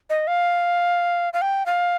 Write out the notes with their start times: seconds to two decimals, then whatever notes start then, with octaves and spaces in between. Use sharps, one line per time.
0.10 D#5
0.27 F5
1.33 F5
1.42 G5
1.66 F5